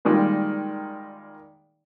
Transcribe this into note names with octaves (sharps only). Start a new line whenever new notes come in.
A#2 D#3 G3 G#3 A#3